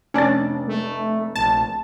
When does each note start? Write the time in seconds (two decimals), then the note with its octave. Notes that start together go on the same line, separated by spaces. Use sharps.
0.14 F1 C#4 D4 D5 A6
0.68 A3
1.35 A#1 A5